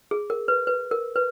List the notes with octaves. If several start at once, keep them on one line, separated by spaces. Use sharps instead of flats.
G#4
A#4
B4
B4
A#4
B4